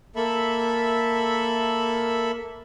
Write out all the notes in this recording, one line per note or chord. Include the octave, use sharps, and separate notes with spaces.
A#3 A4 E5 B5